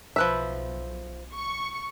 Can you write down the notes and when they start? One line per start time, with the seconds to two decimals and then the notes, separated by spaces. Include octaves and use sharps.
0.16 B1 F3 B4 E5
1.34 C#6